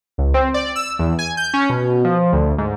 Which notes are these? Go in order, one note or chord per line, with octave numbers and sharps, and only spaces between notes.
C#2
C4
D5
E6
E2
G#5
G6
C#4
B2
F3
D2
G#2